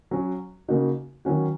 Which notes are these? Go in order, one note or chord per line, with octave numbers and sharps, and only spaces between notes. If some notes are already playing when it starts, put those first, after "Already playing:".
F#3 C#4 F#4
C#3 A#3 D#4 F#4
D#3 F#3 C#4 F#4